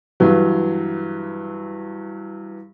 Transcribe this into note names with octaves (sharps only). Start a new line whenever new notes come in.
G2 E3 F#3